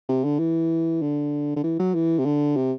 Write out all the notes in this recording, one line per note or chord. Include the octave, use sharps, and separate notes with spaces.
C3
D3
E3
D3
D3
E3
F#3
E3
C3
D3
C3